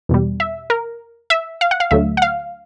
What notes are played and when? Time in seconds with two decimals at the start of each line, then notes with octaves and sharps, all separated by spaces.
0.09 E2 B2 G3
0.40 E5
0.70 A#4
1.30 E5
1.61 F5
1.71 F#5
1.80 F5
1.91 D2 D3 F#3 A3 E5
2.17 F#5
2.22 F5